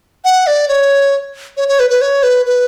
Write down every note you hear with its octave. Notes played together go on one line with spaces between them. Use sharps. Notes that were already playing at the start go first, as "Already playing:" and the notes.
F#5
D5
C#5
C#5
C#5
B4
B4
C#5
B4
B4